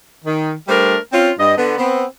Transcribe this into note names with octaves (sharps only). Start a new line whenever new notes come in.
D#3
G3 A3 D4 A#4 C5
C4 C#4 F4
G2 D#5
D3 B3
B3 C4